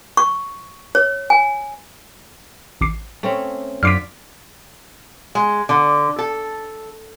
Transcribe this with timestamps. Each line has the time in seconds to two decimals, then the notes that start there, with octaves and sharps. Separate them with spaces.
0.17 C#6
0.95 C#5
1.30 G#5
2.81 A1 D6 C7
3.23 A3 C4 C#4
3.83 F#2 D3 F4 D6 F6 B6 C7 D7
5.35 G#3
5.69 D3
6.18 A4